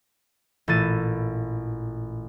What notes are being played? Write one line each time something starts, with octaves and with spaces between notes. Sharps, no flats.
A1 A#2 E4 A6 D#7